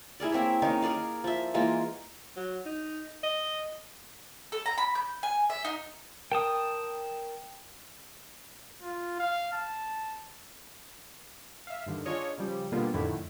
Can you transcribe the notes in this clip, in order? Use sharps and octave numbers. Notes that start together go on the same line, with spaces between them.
E4 G#4 A#4 D5
A#3 C4 C#5 E5
D#3 A#3 C#4 D#4
G#4 A#4 D5 F5
F3 E5
E3 G#3 A#3 F4
F#3
D#4
D#5
A4
A#5
B5
G6
G#5
E5
D#4
A#4 G5 A5 D#6
F4
F5
A5
E5 F5
G2 D3 D#3
D4 F4 G#4 C#5 D#5
C#3 F3 G3
B2 D3 G3 A#3 B3 F4
F2 A2 D3 D#3 A3 E4